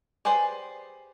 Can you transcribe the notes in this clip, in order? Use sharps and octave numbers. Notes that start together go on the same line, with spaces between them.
G4 G#4 B4 C5 D5